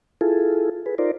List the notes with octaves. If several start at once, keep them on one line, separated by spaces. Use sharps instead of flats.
E4 F4 G#4 A4
G#4 B4
D#4 F4 A#4 C5 D5